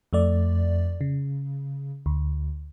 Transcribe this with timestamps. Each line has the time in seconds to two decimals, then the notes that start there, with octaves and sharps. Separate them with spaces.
0.13 F2 A3 D5
1.01 C#3
2.06 D2